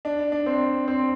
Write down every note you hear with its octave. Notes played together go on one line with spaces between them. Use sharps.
D4
D4
C4
C4